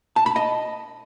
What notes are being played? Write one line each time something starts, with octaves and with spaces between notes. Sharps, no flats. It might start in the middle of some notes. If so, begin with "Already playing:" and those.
A5
B5
D#5